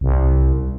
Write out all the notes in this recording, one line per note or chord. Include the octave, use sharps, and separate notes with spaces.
C2